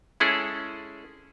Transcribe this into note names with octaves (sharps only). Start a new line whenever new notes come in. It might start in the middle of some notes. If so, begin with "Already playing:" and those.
G#3 C#4 E4 G#4 A4